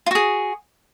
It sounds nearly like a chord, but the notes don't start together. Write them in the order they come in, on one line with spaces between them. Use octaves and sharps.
F4 F#4 G#4